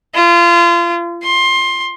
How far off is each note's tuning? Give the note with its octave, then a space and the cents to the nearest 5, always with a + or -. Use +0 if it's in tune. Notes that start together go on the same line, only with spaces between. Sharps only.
F4 -30
C6 +20